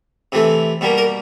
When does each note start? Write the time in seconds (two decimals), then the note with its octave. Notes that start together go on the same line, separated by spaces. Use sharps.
0.32 C3 E3 A3
0.81 B2 G3 A#3
0.98 A#4